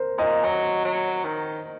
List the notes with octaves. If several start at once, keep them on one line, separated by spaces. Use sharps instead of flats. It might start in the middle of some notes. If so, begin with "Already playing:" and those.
Already playing: A#4 C5
A#2 D#5
F#3 D#5
F#3
D#3